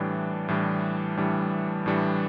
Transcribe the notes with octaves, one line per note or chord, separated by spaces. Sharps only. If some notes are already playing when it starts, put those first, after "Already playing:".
Already playing: A2 E3 G3 D4
A2 E3 G3 D4
A2 E3 G3 D4
A2 E3 G3 D4